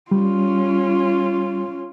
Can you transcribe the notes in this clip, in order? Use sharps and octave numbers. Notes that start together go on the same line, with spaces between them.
G3 C#4 F4